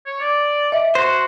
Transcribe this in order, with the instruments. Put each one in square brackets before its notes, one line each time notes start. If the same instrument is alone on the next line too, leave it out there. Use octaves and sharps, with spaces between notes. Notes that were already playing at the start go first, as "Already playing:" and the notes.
[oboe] C#5
D5
[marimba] D#5 E5
[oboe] F#4 [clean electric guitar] C5